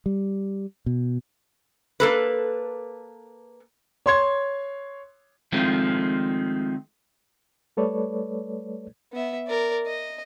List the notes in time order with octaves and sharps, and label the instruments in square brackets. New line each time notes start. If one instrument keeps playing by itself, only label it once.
[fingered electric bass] G3
B2
[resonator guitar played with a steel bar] A#3 A4 B4
[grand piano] C#5 C6 G#6
[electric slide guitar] D#3 F3 G#3 A3 C4
[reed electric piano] G3 A3 A4 B4 C#5 D5
[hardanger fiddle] B3 E5
A#4 D5
D#5